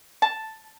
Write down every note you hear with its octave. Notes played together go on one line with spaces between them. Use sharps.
A5